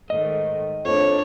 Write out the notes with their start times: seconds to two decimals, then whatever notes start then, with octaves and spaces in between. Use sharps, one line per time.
0.10 G#2 D#3 A3 D#5
0.85 F2 D#3 A3 D4 C#5